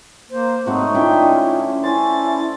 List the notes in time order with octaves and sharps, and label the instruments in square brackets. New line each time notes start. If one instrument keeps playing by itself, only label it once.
[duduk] A#3 [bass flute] C5
[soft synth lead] G#2 [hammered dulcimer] A3 F#4 C#5 [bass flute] C4 [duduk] D#4
[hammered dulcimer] D3 E4 G5 [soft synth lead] C#4 [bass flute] F4
[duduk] C#4 [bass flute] E4 [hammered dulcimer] C5 [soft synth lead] A6